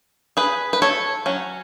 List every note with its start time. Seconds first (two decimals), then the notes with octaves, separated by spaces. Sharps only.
0.37 G#4 B4
0.73 B4
0.82 A4 C#5
1.26 F#3 C#4